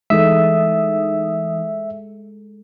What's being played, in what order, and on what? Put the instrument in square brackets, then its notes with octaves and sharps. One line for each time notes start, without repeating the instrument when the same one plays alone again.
[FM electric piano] E3 D#4 D#6 [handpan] G#3 A4 [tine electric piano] E5